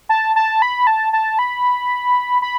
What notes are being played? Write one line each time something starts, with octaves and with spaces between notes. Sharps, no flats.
A5
A5
B5
A5
A5
B5
B5